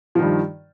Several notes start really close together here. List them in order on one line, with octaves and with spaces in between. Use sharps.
F3 D#3 G2